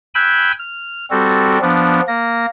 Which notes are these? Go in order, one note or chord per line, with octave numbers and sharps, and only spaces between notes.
G5 G#5 B5 E6 F#6 G6
F6
G3 C4 F#4 A4
F3 B3 D4
A#3 A#6